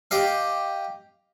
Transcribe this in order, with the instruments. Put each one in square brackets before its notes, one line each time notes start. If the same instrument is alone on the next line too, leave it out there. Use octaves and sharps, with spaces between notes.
[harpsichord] G4 D#5 F5